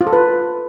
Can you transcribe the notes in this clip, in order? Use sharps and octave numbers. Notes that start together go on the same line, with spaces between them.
F4
A4
B4